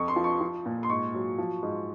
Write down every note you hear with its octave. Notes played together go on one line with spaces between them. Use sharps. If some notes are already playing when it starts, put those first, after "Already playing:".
Already playing: F2 C#6
C6
F3
C#6
F3
A#2
C6
G#2 C#6
F#3
F3
G#2